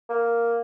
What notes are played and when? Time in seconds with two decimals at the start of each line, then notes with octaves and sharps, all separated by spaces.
0.10 A#3